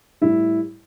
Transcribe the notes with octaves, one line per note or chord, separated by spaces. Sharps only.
A2 G3 E4